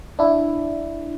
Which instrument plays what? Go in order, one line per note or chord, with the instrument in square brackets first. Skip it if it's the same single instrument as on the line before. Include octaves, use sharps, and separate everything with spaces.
[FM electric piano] D4 E4